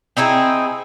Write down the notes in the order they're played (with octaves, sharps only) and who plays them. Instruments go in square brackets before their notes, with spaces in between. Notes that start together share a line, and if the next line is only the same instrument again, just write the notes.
[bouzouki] C4 D#4 E4 G#4